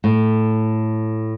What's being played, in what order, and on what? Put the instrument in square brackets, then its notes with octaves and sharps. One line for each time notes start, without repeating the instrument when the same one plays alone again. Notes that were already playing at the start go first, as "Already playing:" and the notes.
[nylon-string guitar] A2